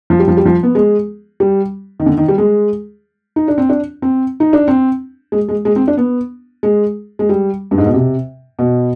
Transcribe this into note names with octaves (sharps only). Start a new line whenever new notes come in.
F3
G3
F3
G3
F3
B3
G#3
G3
D#3
D3
D#3
G3
G#3
D#4
D4
C4
D4
C4
D#4
D4
C4
G#3
G#3
G#3
C4
D4
B3
G#3
G#3
G3
G2
G#2
B2
C3
B2